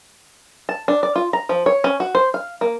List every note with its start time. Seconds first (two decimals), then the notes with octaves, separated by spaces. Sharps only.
0.69 A5
0.88 D4
1.03 D5
1.16 F4
1.33 A#5
1.49 F3
1.66 C#5
1.84 C#4
2.00 F#4
2.15 C5
2.34 F5
2.61 A#3